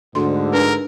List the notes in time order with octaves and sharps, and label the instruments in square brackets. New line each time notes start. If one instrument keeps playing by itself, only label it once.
[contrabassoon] D2 [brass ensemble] G#2 D3 [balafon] C6
[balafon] D4 B4 [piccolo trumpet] A#4